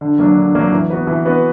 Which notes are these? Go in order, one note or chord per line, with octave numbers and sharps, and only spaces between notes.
D3
F#3 A#3 D4
D3
F#3 A#3 D4
E3
B3 F#4 B4
E3
B3 F#4 B4